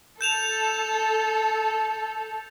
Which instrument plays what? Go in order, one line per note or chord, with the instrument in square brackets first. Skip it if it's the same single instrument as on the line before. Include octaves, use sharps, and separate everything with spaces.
[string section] A4 [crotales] G6 E7 F7